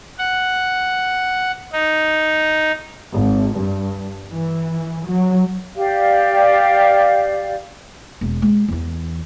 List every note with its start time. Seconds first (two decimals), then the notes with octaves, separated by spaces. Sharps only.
0.18 F#5
1.72 D#4
3.14 G#1
3.58 G2
4.30 E3
5.06 F#3
5.76 G4 D5 F5
8.21 E1
8.42 G#3
8.68 E2 E3